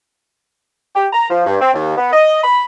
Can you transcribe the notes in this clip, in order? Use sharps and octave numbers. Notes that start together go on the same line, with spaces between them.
G4
A#5
F3
G2
C4
D#2
B3
D#5
B5